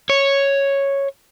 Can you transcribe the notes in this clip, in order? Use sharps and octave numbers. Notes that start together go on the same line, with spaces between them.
C#5